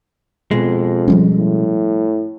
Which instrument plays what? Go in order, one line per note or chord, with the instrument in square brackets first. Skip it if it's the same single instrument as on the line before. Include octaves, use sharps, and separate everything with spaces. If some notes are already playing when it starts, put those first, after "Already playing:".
[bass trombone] F2 [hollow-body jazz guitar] B2 G#3
[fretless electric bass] F3 G3 C#4
[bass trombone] A2